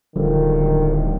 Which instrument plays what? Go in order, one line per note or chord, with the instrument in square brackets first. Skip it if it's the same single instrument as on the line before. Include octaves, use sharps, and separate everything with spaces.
[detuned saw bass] D1 [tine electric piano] D3 F3 G3 [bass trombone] D#3